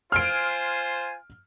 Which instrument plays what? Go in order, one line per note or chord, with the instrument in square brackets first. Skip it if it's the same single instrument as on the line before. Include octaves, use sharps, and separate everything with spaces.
[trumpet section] F4 C5 G#5 [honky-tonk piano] F6 D7